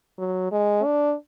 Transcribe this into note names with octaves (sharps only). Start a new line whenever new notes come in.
F#3
G#3
D4